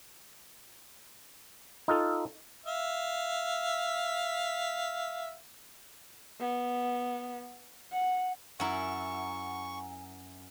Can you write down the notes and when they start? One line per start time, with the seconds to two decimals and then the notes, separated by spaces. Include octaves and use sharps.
1.88 D#4 F4 A4
2.65 E5 F5
6.40 B3
7.92 F#5
8.60 F#2 E4 F#5 G#5 A#5 C#6